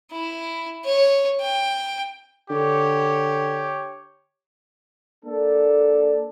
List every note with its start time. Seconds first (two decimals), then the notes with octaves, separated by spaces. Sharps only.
0.12 E4
0.85 C#5
1.41 G5
2.50 D3 G4 C#5
5.25 A#3 D4 A4